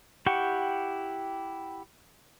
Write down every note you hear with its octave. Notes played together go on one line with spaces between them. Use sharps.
E4 G4 F#5 G5 C#6